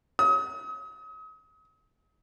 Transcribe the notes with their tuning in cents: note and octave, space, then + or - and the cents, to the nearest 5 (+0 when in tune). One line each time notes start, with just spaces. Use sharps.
D#6 +40